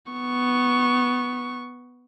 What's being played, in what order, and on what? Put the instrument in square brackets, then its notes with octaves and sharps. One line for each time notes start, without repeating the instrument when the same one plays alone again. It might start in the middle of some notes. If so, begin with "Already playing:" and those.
[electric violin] B3 C#6